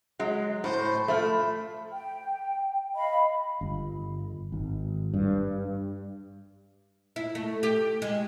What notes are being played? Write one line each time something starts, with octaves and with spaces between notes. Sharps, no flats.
F#3 G#3
A2 C5
F3 A3 B5
G5
D#5 F5 B5
G1
G#1
G2
E4
A3
G4
G#3